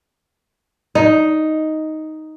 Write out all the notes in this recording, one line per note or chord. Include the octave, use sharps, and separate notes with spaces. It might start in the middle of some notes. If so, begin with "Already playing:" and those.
D#4